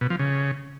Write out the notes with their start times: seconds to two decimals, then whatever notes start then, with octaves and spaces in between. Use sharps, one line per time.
0.01 B2
0.10 F3
0.19 C#3